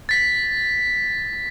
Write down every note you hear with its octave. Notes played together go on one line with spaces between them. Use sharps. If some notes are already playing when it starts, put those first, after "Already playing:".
A6 B6